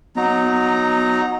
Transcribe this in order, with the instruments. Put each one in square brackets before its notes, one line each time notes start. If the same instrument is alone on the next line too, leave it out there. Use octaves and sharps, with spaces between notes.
[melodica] F#3 D#4 A#5 [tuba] B3